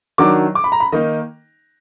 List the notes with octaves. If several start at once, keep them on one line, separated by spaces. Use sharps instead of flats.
D#3 F#3 D4 D6
D6
B5
A#5
B5
D#3 A#3 D#4 D#5